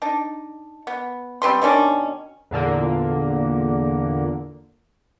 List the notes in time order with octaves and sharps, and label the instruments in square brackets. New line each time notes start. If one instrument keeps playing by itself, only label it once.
[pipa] D4 D#4
B3
G3 C4 B4 C6
B2 D#3 C#4 D4
[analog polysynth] E2 A#2 D3 A#3